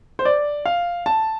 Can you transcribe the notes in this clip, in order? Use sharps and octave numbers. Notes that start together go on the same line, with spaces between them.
C5
D5
F5
A5